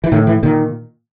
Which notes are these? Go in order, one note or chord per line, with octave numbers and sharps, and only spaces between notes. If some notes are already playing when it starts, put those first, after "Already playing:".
E3
A2 D#3
E3
A#2 D#3